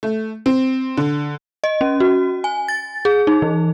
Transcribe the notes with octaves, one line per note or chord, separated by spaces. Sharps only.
A3
C4
D3
D#5
C#4
F#4
G#5
A6
G#4
D#4
E3